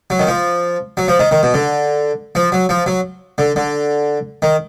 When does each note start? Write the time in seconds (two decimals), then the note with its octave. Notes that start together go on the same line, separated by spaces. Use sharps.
0.10 F#3
0.19 D#3
0.27 F3
0.97 F#3
1.08 F3
1.19 D#3
1.31 D#3
1.43 B2
1.54 D3
2.35 F3
2.52 F#3
2.69 F3
2.86 F#3
3.38 D3
3.56 D3
4.42 D#3